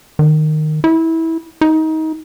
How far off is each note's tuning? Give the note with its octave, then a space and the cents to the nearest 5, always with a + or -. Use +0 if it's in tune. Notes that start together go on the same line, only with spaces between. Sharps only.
D#3 -15
E4 -20
D#4 +25